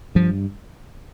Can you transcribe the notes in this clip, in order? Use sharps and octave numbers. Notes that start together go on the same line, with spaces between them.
G2 F3